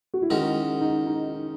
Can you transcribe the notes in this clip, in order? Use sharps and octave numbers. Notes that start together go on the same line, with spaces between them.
F#4
E4
D#3 G#3 C#4 D#4 F#4
D#4
D#4